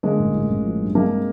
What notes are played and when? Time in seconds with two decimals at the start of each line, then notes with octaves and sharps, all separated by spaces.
0.03 D3 G#3 A#3
0.19 A1
0.34 A1
0.49 A1
0.64 F3
0.80 G2
0.95 C3 G#3 A#3